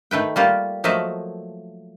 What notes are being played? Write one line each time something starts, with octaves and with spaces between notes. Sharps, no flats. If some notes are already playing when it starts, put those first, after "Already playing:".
D#3 A3 B4 G5
G3 A3 A#3 F4 G4
F3 F#3 A3 A#3 D#5 E5